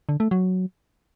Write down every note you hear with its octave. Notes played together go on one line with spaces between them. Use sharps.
D3
A3
F#3